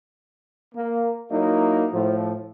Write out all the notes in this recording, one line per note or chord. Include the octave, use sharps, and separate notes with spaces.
A#3
F#3 A#3 D#4 E4
A2 F3